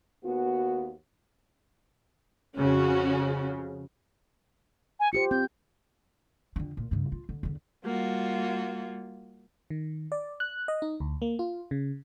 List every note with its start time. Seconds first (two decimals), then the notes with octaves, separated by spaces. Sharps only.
0.24 D#2 B3 F#4
2.56 F2 C#3 C#4 F#4
5.00 G#5
5.13 F4 G4 C5 C#7
5.31 C4 G6
6.56 F2 D3
6.77 A#2
6.91 G2 C#3
7.12 F4
7.29 D3
7.43 E2 D3
7.84 G3 A#3 F4 F#4
9.70 D#3
10.12 D5
10.40 F#6
10.68 D#5
10.82 D#4
11.00 D2
11.22 A#3
11.39 F4
11.71 C#3